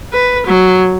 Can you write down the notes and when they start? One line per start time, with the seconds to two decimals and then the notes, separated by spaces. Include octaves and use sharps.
0.12 B4
0.46 F#3